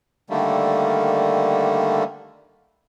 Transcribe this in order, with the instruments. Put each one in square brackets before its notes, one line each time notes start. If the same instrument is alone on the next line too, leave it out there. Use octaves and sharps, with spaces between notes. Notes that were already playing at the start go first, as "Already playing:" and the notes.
[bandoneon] D3 D#3 G3 A3 A#3